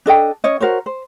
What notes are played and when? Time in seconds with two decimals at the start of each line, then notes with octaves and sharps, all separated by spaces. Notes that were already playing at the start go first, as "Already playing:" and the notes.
0.06 D4 A4 D#5 G5
0.44 C#4 C#5 D#5
0.60 F#4 A#4 C5 C#5
0.86 C5